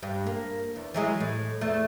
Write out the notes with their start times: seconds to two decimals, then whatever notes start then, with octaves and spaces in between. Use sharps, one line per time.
0.03 G2
0.27 A#3
0.76 E2
0.94 E3 F#3 G#3
1.20 A2
1.61 E2 A3